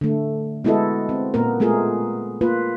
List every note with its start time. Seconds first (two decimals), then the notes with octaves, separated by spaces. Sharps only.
0.01 D3 A3
0.64 G#3 B3 E4 F#4 A4 D#5
1.09 C4
1.34 A#2 A#3 B3 A#4
1.60 G#3 A3 B3 F4 G#4 A#4
2.41 A#3 F4 B4